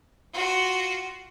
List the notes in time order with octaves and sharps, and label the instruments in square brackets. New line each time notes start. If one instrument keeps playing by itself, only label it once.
[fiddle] F4 F#4